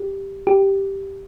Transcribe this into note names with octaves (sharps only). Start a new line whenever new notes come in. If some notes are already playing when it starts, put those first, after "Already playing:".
Already playing: G4
G4